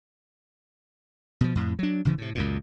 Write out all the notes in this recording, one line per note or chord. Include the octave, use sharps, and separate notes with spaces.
B2 F3
F2 A2
F#3 D4
G#1 C#3 E3 F3
A2 C3
C#2 F#2 A#2